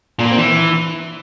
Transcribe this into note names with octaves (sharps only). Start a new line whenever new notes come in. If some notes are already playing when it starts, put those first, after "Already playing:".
A#2
A#3
C4
E3